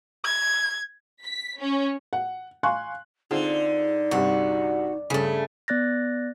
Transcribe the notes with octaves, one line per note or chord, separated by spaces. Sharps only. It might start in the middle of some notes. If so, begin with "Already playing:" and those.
G#6
B6
C#4
F#5
F5 G#5 C6 C#6 F#6
D3 C4 D#4 F4 G#4
C2 G2 C3 F#4
G2 C#3 A3 C#4 C#5
B3 D5 F#6 A6 A#6